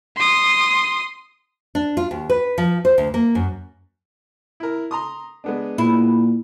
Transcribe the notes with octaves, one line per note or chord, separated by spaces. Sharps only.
C6 D#6
D4
F4
D#2
B4
F3
C5
D2
A#3
F#2
E4 A#4
A#5 C6 D#6
G#3 B3 D4
A#2 E4